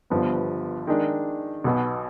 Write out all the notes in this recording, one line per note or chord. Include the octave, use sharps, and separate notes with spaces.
G1 G2 F3 B3
D#3 G#3 D4
B1 B2 B3